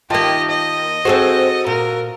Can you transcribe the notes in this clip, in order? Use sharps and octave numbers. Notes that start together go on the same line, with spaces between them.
D#3 A#3 F4 G4 D#5 G5 A5
D#5
C4 F#4 G#4 A4 C5
A#2 A#4